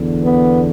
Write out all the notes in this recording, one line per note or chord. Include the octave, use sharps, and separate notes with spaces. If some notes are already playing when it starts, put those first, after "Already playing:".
Already playing: E2 D3
B3